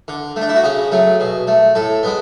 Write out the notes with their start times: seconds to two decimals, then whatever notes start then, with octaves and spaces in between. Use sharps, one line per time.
0.08 D3
0.36 A3
0.41 D4
0.49 E4
0.56 F#4
0.64 C#3 G#4
0.92 F#3 A3
1.20 B2
1.47 A3
1.75 A2 A4
2.03 G#3 B3